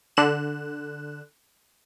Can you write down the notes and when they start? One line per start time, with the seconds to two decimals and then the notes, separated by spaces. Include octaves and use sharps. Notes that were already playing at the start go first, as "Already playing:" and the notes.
0.17 D3 F#6 E7